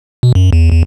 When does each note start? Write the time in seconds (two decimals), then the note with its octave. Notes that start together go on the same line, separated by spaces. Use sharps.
0.23 B2
0.35 F#2
0.53 E2
0.72 E2